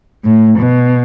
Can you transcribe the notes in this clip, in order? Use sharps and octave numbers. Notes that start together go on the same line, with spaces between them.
A2
B2